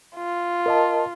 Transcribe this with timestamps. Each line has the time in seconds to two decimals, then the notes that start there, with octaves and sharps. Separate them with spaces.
0.15 F4
0.66 A#4 D#5 A5